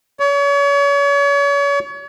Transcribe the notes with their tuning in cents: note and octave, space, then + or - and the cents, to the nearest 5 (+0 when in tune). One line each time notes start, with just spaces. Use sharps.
C#5 +35